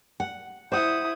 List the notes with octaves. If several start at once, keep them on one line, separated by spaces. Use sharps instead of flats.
F#5
E4 C5 F#5 D#6